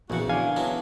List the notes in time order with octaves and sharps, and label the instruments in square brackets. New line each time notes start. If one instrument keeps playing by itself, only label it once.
[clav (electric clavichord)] A#1 [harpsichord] E2 C#3 [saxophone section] F#4
[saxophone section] A#2 D3 D4 [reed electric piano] F5 [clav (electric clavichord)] G#5
[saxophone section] F#3 G#3 C#4 [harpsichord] B3 D4 E4